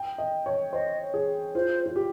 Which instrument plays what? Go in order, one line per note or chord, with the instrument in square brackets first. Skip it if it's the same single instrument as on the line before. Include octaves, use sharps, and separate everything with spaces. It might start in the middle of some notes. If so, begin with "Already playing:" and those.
Already playing: [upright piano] G5
D#5
C#5
[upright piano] C5 [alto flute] D#5
[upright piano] G#4
[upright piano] F4 [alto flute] C5
[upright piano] F4
G4